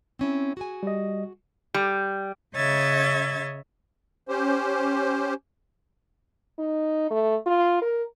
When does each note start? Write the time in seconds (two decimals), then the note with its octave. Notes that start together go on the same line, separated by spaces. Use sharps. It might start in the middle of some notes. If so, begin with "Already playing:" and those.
0.19 C4 C#4 E4
0.57 F#4 G#4 G#5
0.83 G3 D#5
1.74 G3
2.55 C#3 C#5 D#5 E5 G#6 A6
4.28 C#4 G4 C5
6.59 D#4
7.11 A3
7.46 F4
7.82 A#4